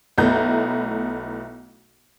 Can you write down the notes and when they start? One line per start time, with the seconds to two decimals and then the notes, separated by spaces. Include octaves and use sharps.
0.18 B1 A3 B3 E4 A#5 G6